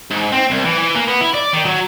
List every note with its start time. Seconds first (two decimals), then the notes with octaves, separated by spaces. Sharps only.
0.11 G#2
0.33 C4
0.51 C2
0.65 E3
0.78 E3
0.95 A#3
1.08 B3
1.21 E4
1.34 D5
1.53 D#3
1.65 F#3